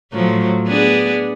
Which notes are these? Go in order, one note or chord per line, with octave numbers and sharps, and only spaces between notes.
A2 F3 F#3
B3 D4 G#4